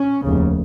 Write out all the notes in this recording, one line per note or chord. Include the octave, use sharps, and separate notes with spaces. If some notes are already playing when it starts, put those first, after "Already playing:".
Already playing: C#4
F1 D#2 C#3